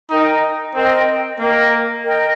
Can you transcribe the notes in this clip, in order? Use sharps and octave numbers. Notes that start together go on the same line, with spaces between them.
D#4 A#4 D#5 G5
C4 A#4 D#5 G5
A#3 A#4 D#5 G5
A#4 D#5 G5